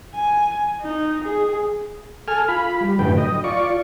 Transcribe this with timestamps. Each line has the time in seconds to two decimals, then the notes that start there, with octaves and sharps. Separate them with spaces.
0.15 G#5
0.81 D#4
1.24 G#4
2.28 A4 G#5 F6
2.48 F4 B5
2.80 G3
2.99 F#2 A2 D3 B4 G5
3.18 D#5
3.44 F4 D5 C#6